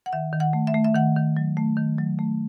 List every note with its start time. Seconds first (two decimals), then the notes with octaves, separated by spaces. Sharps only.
0.06 F#5
0.13 D#3 E5
0.33 D#3
0.40 F#5
0.53 A3
0.67 E5
0.74 A3
0.84 E5
0.94 D#3 F#5
1.16 D#3
1.37 F#3
1.57 A3
1.77 D#3
1.98 F#3
2.19 A3